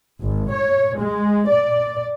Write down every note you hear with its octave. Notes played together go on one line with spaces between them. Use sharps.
G#1
C#5
G#3
D5